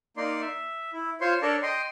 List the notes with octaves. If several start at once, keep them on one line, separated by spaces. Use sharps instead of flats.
A#3 D#4 D5 C6
E5
E4
F4 C5 C#5 C6
D4 A4 A#4 C#5 D5 A5
D#5 G5 C6